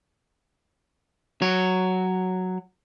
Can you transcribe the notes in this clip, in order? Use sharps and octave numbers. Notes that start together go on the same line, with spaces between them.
F#3 C#5